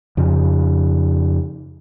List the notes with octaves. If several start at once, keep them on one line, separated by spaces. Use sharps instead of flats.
F2 C#3